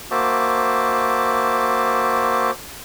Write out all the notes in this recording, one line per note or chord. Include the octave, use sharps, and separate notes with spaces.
A#3 F#4 C5 E5 A5 D6